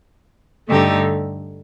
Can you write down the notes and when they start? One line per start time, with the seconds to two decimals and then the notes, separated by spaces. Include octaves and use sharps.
0.67 G2 D3 A3 D#4 G4